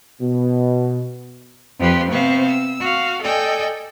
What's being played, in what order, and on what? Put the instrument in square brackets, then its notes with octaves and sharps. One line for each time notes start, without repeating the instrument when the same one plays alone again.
[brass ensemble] B2
[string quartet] F2 F3 G4 B4 C6
C3 B3 C4 C5 F5 C#6
E6
F#4 F5
A4 D5 D#5 G5 G#5